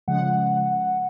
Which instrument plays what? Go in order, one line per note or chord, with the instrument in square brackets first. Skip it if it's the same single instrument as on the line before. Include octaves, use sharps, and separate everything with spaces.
[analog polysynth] C#3 F3 G#3 F#5